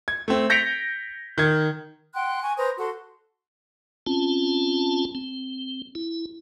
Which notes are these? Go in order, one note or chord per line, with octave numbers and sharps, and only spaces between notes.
G#6
A3 C4
G6 A#6 B6 C#7 D7 F7
D#3 G#6
F#5 G5 C6 F#6
G#5 C#6
B4 C5 A#5 D#6
F#4 A4 F#5 C6
C4 C#4 F4 A5
C4
E4